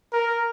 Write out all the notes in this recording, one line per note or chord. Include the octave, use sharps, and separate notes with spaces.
A#4